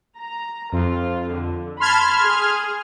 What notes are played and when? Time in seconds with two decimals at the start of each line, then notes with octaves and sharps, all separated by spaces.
0.18 A#5
0.72 F2 F4
1.31 D3
1.80 A5 B5 C6 F6 G#6
2.24 G#4